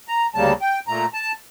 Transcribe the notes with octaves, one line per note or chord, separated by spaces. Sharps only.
A#5
D2 C#3 G3 A#3 A5
G5
A#2 A3 A#5
A5